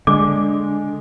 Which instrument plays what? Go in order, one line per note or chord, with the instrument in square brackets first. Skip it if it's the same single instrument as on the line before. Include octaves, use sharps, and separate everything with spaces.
[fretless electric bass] D3 [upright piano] G#3 [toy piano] D6